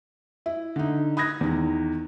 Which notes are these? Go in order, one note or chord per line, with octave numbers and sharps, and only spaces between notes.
E4
D3 D#4
B5 D#6 F#6 G#6 A#6
E2 D#3